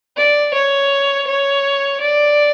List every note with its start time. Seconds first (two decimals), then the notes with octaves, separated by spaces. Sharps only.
0.17 D5
0.54 C#5
1.27 C#5
2.01 D5